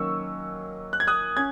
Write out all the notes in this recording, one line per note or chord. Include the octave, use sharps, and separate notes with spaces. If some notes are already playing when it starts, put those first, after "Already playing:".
Already playing: D#3 F#3 A#3 C#4 C#6 E6
F#6
G#6
D#6 F#6
C#4 G#6